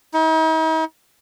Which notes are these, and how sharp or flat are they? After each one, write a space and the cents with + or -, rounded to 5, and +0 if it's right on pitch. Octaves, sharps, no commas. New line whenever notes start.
D#4 +45